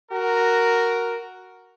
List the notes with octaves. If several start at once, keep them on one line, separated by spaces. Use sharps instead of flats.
F#4 A#4